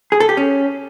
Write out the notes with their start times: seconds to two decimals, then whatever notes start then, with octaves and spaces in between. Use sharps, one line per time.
0.12 G#4
0.20 A4
0.29 G4
0.37 C#4